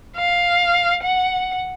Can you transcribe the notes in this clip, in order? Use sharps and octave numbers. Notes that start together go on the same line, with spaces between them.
F5
F#5